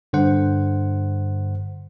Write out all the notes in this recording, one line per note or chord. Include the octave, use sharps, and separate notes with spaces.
G2 D3 C5 F#5